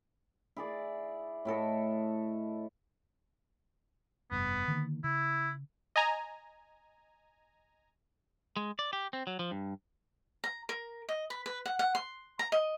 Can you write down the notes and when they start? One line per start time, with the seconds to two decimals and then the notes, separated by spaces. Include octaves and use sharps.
0.57 E4 G#4 D5
1.45 A2 E4 A4 D#5
4.31 F1 G2 B3
4.68 D3 D#3 A#3
5.04 C#3 E4
5.96 D#5 G#5 A#5
8.57 G#3
8.79 D5
8.93 G4
9.13 C4
9.27 F#3
9.39 F3
9.51 G2
10.44 A#5
10.69 A#4
11.09 D#5
11.30 B4
11.46 B4
11.65 F#5
11.79 F#5
11.95 C6
12.39 A#5
12.52 D#5